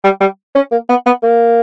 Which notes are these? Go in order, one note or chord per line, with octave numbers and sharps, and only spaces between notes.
G3
G3
C#4
A#3
B3
B3
A#3